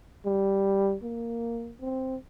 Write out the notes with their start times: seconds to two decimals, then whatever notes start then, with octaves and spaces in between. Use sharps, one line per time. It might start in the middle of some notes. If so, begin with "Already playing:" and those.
0.25 G3
1.03 A#3
1.81 C4